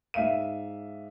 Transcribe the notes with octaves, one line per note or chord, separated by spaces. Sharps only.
G#2 E5 F5 D#7